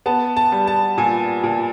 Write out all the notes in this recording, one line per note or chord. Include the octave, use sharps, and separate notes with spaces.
B3 A5
A5
G3
A5
A#2 G#5
A#2